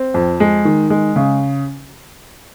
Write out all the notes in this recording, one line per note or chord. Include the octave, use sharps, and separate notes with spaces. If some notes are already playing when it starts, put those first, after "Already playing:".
Already playing: C4
F2
G#3
D#3
G#3
C#3